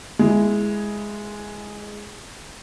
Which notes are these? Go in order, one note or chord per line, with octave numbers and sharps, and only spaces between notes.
G#3 E4